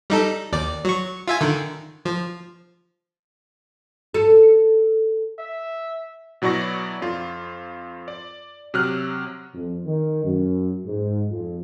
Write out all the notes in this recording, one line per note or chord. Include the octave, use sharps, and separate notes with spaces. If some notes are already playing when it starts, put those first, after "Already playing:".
G3 D#4 A4
D#2 D5
F#3 C#6
F4 E5 G#5
D3 D#3
F3
A4
E5
B2 F#3 E4 D5 C#6 A#6
F2 F4
D5
C3 F#3 F6 F#6
F2
D#3
F#2
G#2
F2